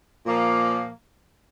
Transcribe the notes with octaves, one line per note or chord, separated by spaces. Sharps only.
A#2 F3 A#3